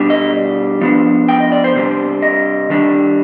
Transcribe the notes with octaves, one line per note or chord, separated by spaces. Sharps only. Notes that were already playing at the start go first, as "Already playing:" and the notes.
Already playing: B2 G3 D4
D#5
F3 B3 D4
G5
D#5
D5
C5
C3 G3 D4 C5
D#5
D#3 G3 D4